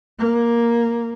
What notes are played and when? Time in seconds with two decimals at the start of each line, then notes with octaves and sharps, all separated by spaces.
0.19 A#3